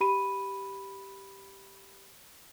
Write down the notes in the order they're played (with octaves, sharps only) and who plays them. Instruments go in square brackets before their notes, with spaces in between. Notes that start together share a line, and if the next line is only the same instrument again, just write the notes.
[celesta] G4 B5 D#7